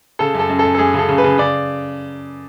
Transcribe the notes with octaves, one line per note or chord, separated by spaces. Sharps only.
C#3 A4
F#2
A4
F#2
A4
F#2
A4
F#2 G#4
C#3 A4
C#3
B4
C#3
C#3 D5